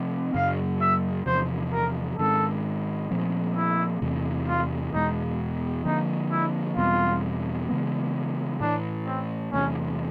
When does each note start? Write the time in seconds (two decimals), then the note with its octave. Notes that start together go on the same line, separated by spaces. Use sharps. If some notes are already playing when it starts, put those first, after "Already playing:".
Already playing: C3 F3 A3 C4
0.35 F#2 C#3 F#3 F5
0.81 E5
1.26 E2 C3 F3 C5
1.73 A#4
2.18 G#2 D#3 G#3 C#4 A4
3.11 A#2 F3 A3 C4
3.56 E4
4.02 E2 C3 E3 A3
4.48 F4
4.94 E2 B2 G#3 D#4
5.85 D3 F3 A#3 D4 D#4
6.31 E4
6.77 E2 B2 G3 C4 F4
7.69 C#3 E3 G#3 B3
8.61 A2 E3 A3 D4
9.06 C4
9.52 E2 C3 E3 A3 C#4